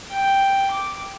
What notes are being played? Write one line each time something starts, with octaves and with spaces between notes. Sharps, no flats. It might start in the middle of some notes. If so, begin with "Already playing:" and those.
G5
D6